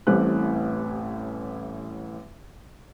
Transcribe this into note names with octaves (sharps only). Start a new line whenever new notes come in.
A1 A2 G3 C4 F#6